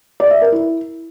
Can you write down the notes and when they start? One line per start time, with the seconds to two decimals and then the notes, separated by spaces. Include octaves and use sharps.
0.20 D5
0.31 E5
0.42 A#4
0.52 E4